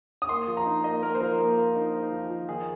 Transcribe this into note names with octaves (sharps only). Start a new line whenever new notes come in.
D#6
A#3 C6
F3
A#5
D#4
A#3 D#5
A#3 A#4
C5
F3 A#4
A#3
A#3
D#4
D#4
F3
F3
D#3 G#4